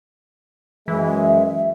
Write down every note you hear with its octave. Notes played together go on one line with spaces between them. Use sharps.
F#2 E3 G#3 E5